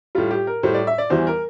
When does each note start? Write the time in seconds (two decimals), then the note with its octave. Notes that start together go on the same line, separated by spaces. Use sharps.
0.15 A2 G3 F4
0.31 G4
0.47 A#4
0.63 A2 G3 C5
0.74 D5
0.87 E5
0.98 D5
1.10 E2 E3 G3 C5
1.27 A#4